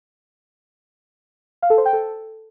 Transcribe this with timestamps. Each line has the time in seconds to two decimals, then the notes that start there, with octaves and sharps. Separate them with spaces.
1.62 F5
1.70 A4
1.78 C5
1.85 G5
1.93 A4